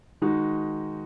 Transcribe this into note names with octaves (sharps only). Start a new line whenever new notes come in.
D#3 G#3 D#4 F#4